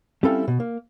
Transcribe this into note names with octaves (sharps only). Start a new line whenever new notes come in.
G3 C4 C#4 E4 A4 F5
B2
A#3